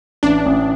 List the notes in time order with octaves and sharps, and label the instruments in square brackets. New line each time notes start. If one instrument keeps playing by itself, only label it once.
[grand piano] A1 [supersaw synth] D4
[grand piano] A1